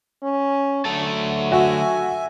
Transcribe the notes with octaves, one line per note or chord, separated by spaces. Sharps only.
C#4
D3 F#3 A3 A5
F#4 E5 G#5